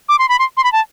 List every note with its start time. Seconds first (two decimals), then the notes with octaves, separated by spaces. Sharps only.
0.09 D6
0.19 C6
0.29 B5
0.39 C6
0.57 C6
0.64 B5
0.72 A5